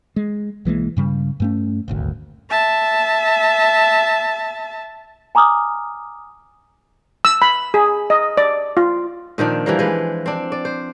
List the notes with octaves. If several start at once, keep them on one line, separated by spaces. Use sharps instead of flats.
G#3
B1 E3 G#3 A#3
G2 C#3 G3
G2 A3 C#4
D#1 G#1 D2
E5 A5
G#5 A#5 D6 D#6 F6
E6
B5
G#4
D#5
D5
F4
A#2 D#3 F3 D4
E3 F3 G3 A#3
G#3 B4
C4 D4
D5
C5